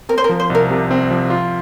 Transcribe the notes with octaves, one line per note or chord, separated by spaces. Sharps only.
C4 A#4
C5
A#4
F3
C5
C2 A#4
C3
C4
F3
F4